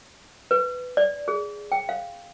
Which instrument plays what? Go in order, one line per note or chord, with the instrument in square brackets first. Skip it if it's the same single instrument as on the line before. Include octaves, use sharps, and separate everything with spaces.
[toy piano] B4
D5
G#4
G5
F5